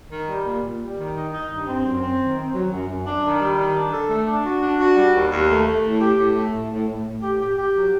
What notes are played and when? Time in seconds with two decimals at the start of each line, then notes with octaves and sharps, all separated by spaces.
0.10 D#3
0.27 G3
0.45 A#2
0.62 A#2
0.80 G3
0.98 D#3
1.15 D#4
1.32 D#4
1.49 G2
1.66 C4
1.83 F#2
2.01 C4
2.18 D#3
2.37 C4
2.54 F#3
2.70 F#2
2.88 F#2
3.05 D4
3.23 D#3
3.41 G3
3.58 D#3
3.75 D4
3.92 A4
4.09 A3
4.27 D4
4.45 F#4
4.62 D4
4.80 F#4
4.97 G3
5.14 D#2
5.31 D#2
5.49 A3
5.66 A3
5.84 A2
6.01 G4
6.18 A2
6.35 A3
6.53 A2
6.70 A2
6.88 A2
7.05 A2
7.23 G4
7.39 G4
7.57 G4
7.74 F#3